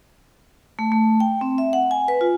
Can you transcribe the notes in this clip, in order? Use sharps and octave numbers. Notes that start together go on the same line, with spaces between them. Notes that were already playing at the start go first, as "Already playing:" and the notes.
A3
A3
G5
C4
E5
F#5
G#5
B4
F4